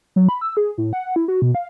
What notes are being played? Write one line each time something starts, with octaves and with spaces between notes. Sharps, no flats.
F#3
B5
E6
G#4
A2
F#5
E4
F#4
B2
F5